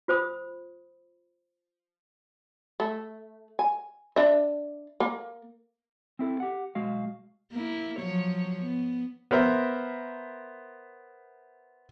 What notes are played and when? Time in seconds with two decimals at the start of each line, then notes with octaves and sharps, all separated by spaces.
0.08 F4 C5 B5 D#6
2.80 A3
3.59 G#5
4.16 D4 E5
5.00 A#3
6.19 C4 E4 A4
6.40 G4 F#5
6.75 B1 G#3 F#4 F5
7.52 A#3 E4
7.99 F3 F#3 C#5
8.62 B3
9.31 B3 A#4 C5 E5